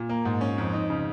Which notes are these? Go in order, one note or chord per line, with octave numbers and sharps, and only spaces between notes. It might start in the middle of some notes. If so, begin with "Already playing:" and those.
Already playing: A#2
A#3
G#2
C#4
F2
D#4
C#3